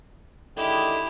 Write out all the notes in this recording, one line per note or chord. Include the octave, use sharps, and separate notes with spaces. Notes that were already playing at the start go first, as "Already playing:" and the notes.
D3 D#3 G#3 E4 G4